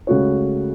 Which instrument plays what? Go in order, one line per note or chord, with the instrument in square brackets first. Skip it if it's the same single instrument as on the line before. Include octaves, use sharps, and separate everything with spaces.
[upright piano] C#2 C#3 A3 F#4 C#5